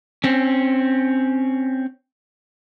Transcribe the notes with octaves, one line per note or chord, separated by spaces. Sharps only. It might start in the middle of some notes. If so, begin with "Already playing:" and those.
C4 C#4